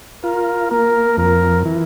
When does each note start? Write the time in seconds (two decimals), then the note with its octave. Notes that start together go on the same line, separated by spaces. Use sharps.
0.24 F4 A#4
0.70 A#3 A#4
1.17 F2 A#4
1.65 E3